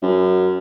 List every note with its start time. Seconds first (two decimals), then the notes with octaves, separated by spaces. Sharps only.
0.02 F#2